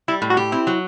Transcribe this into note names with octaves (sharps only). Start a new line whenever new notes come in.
G3 E4
A2
F#4
G4
C4 E4
F#3